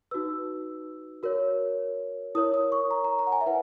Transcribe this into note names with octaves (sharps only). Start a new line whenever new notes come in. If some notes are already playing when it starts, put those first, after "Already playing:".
D#4 F#4 B4 E6
F#4 A#4 C#5
E4 A#4 C#5 D#6
D#6
C#6
A#5
A#5
A#5
F#5
G#5
E5
E4 B4 F#5